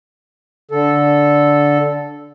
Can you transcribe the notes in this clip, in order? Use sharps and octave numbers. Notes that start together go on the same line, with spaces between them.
D3 A4